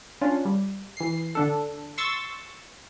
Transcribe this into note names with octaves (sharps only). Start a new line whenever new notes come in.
C#4 D4 F4
G3
E3 C7
D3 D4 A4
C6 C#6 E6 A6